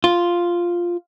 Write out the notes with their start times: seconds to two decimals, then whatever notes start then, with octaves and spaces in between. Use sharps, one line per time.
0.04 F4